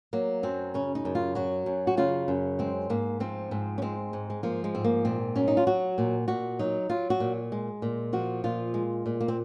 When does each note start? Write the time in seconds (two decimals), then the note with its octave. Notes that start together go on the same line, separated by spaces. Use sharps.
0.13 F#3 A#3
0.43 F#2 C4
0.74 C#3 C#4
0.95 D#4
1.05 F#2
1.15 F4
1.35 F#3 F#4
1.66 F#2
1.87 F#4
1.97 C#3 F4
2.28 F#2
2.59 G#3 C4
2.90 G#2 A#3
3.20 F3 C4
3.51 G#2 C4
3.78 C#4
3.82 G#3 C4
4.13 G#2
4.30 G#3
4.43 F3 A#3
4.64 G#3
4.75 G#2 C4
4.84 A#3
5.05 A#2 C4
5.36 F#3 C#4
5.48 D#4
5.57 F4
5.67 F#3 F#4
5.98 A#2
6.28 A#2 F#4
6.59 F#3 D#4
6.90 F#3 F4
7.10 F#4
7.20 A#2
7.52 G#3
7.82 A#2
8.13 F3 F#4
8.44 A#2 F4
8.74 G#3
9.06 A#2
9.21 A#3
9.28 C4